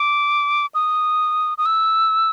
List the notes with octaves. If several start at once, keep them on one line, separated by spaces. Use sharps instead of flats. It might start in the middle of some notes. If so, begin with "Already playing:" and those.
Already playing: D6
D#6
D#6
E6